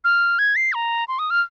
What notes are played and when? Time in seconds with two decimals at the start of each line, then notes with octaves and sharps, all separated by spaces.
0.04 F6
0.39 G#6
0.56 C7
0.73 A#5
1.08 C6
1.19 D#6
1.30 F6